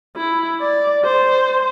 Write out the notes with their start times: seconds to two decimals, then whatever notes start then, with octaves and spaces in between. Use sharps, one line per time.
0.17 E4
0.61 D5
1.04 C5